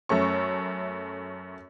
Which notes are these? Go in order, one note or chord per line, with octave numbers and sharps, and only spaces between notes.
F#2 A3 C#4 C#6